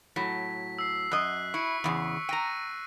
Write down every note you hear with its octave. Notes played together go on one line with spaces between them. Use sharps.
A2 F#3 B6
E6 C7
F#2 D#5 F#6
E4 C#6 C#7
E2 A2 C#3
G5 A#5 A#6 D#7